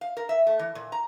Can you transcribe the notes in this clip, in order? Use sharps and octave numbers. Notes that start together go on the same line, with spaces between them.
F5
A#4
E5
A3
E3
A#2
A#5